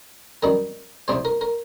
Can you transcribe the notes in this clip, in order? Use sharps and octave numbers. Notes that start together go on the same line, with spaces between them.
F#2 D#3 G3 A#4
C2 C3 G3 C5
A#4
A#4